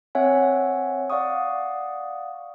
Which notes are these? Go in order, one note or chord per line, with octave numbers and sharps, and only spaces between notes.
C4 C#5 E5 F#5 G#5
D5 F5 F#5 C#6 D#6